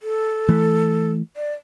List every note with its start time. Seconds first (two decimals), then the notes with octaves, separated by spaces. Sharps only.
0.03 A4
0.49 E3 A3
1.36 D5